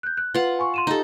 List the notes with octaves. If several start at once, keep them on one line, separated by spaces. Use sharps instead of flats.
F#6 G6
F#6
F4 B4 F#5
G#5 C6 C#6
C6 D#7 E7
D#4 G4 A4 A#5